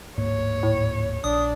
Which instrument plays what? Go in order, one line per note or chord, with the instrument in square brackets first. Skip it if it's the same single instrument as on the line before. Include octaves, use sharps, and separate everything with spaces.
[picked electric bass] D1 G#2 A#3 [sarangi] C#5
[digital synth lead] A2
[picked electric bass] A#1 [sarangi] D4 [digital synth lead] D#6